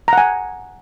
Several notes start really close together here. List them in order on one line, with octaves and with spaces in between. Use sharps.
A#5 F#5 G#5